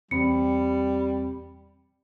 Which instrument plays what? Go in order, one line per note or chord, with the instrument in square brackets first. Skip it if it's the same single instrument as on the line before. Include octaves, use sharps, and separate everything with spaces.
[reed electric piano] E2 C4 B5 [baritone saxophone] G3 [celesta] C#7